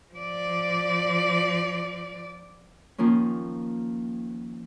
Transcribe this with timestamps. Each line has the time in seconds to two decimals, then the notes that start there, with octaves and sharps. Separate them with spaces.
0.14 F3 D5
2.98 D#3 F3 A#3 C#4